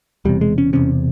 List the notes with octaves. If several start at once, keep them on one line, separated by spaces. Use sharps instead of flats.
E1 E2 C3 G3
G#3
C#4
E1 E2 C3 C#4